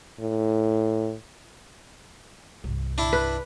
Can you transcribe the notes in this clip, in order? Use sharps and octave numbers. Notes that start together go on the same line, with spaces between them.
A2
C2 G2
D4 E4
B4